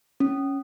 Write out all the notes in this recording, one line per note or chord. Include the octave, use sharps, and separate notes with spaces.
C#4